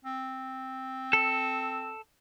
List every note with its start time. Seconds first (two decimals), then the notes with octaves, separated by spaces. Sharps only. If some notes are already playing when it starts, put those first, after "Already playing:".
0.05 C4
1.13 A4